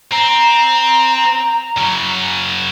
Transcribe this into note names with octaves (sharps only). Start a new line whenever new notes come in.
C4 A#5
C#3 F#3